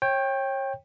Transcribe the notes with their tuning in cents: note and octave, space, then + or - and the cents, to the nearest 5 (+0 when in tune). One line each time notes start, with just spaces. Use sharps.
C#5 -30 G5 +10